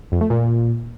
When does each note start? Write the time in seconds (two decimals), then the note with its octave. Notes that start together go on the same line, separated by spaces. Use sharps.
0.12 F2
0.21 A3
0.30 A#2